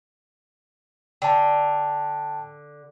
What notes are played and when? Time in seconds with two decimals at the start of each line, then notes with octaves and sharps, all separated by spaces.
1.22 D3 G5 A5